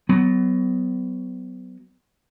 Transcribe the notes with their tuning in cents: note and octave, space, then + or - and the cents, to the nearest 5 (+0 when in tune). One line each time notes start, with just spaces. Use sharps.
F#3 +20 B3 +25